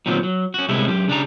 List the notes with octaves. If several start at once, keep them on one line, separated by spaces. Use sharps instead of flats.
A#2 D#3 F#3 B3 C4
F#3
C#4 F#4
C2 A2 C3 G#3 B3 E4
F#2 G4
C#3 D4 G4 A#5